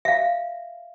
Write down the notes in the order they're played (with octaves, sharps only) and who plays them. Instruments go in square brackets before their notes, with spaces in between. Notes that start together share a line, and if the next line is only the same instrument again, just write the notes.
[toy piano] E5 F5